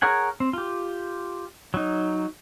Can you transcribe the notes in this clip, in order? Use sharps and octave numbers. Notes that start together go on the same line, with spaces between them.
G#4 A#4 C#5 F#5 G#5
C4
F4 G4
F#3 D#4